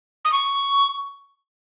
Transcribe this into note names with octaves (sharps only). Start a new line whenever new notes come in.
D#6
C#6